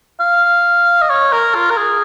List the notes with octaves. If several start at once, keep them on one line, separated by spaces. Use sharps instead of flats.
F5
D#5
C#5
A#4
F4
A#4
G#4